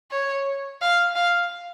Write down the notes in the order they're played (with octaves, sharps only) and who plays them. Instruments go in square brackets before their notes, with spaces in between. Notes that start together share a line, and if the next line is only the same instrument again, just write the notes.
[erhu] C#5
F5
F5